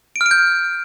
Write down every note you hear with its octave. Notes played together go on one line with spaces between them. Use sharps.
D7
F6
D7
G6